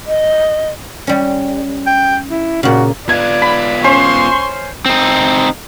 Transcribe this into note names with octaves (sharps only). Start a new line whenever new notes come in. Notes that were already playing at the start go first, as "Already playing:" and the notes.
D#5
G3 C#4
G5
E4
A#2 C#3 F#4
B3 F4 D5 G#6
B5
C#4 C5 C6 C#6
C4 D#4